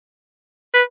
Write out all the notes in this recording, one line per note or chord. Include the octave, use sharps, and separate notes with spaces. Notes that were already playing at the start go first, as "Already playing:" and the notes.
B4